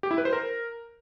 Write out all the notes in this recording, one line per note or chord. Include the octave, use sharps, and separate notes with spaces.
G4
E4
B4
C5
A#4